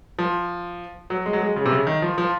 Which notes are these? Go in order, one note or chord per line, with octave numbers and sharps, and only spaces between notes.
F3
F#3
G#3
F#3
G#3
C#3
C3
C#3
D#3
F3
F3